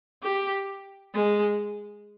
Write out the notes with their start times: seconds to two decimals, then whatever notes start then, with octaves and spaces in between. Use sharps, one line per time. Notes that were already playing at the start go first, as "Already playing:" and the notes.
0.23 G4
1.14 G#3